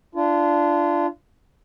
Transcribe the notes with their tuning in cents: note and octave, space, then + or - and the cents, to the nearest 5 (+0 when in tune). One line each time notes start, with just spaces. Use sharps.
D4 +0 F4 -30